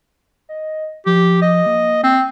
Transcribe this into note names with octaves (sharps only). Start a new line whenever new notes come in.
D#5
F3 G4
D#5
A#3
C4